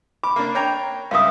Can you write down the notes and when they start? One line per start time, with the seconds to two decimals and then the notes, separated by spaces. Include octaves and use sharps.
0.23 B5 D6
0.36 A#3 D4
0.55 C#5 G5 A#5
1.11 C#2 G2 E5 F5 D#6